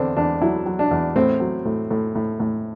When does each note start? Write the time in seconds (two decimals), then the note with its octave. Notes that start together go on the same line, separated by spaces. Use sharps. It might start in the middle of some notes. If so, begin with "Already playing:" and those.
Already playing: E2 D3 C4 D4
0.17 E2 D4
0.41 F#3 E4
0.66 F#3
0.79 D4
0.91 E2
1.16 A2 C4
1.40 F#3
1.65 A2
1.91 A2
2.15 A2
2.40 A2